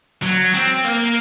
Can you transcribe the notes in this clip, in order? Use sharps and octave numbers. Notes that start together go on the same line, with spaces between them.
F#3
C4
A#3